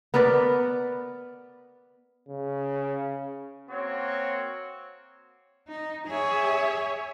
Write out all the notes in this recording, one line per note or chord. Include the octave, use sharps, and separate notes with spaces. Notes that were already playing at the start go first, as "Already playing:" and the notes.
B3 A#4 B4 D5
C#3
A#3 C4 F#4 C#5
D#4
G#4 C#5 E5 G#5